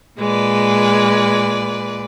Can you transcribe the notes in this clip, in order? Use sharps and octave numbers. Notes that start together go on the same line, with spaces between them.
A#2 G#3 B4 D5